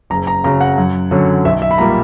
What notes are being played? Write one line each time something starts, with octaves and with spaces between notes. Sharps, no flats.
F#1 A#5
A#5
F#2 C#3 F#3 A#5
F#5
F#2
D3 F#3 C#4
B1 E5
E5
B5
A#2 G3 A#3 A#5